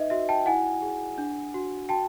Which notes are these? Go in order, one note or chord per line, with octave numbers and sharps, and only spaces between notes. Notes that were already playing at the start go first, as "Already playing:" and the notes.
Already playing: D#4 B4 D#5 E5
F#4 E5
G5 A5
E4 F#5 G#5
G#4
D4
F#4
F#4 G5 A5